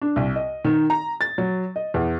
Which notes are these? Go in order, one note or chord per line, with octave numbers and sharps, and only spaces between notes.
D4
C2
D#5
D#3
A#5
A6
F#3
D#5
E2